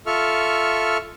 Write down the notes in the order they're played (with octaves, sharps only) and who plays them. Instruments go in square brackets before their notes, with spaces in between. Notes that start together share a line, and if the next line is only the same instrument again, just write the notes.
[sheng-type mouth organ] F4 A4 E5 C#6 F6